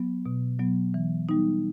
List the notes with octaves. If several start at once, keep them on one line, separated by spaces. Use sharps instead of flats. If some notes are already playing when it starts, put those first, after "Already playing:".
Already playing: F#3 B3
B2
F#3 B3
E3
G3 B3 D#4